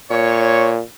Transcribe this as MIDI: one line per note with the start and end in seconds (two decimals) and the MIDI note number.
0.11 0.81 46
0.11 0.71 73